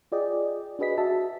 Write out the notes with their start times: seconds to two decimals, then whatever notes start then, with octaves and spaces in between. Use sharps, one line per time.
0.12 F4 G#4 D5 D#5 G5
0.79 D4 F#4 G#4 B4 D#5 B6
0.98 F#4 E5 A5